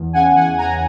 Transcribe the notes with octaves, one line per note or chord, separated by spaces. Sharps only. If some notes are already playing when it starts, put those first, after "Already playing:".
Already playing: E2
C#3 F#5 G#5
E3 F#5 G#5
C#3 G#5 A#5